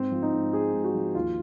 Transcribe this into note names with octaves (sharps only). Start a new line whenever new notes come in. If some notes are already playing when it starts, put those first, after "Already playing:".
Already playing: G#2 C4
F3
D#4
G#2
G#3 G#4
G#2
F#4
F3
D#2 F4